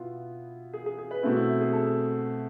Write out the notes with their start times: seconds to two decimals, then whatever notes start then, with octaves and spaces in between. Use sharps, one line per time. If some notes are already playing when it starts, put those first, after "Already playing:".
Already playing: B2 B3 E4 F4
0.73 G#4
0.86 G#4
0.98 G#4
1.11 B4
1.23 B2 A3 C4 E4
1.36 E4
1.61 G#4
1.73 A4